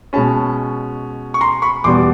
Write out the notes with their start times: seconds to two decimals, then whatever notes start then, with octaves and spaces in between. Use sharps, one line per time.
0.13 B2 G#3 C#4 A5 B5
1.34 C#6
1.41 A#5 C6
1.62 B5 C#6
1.84 E2 B2 G3 B3 C6 D6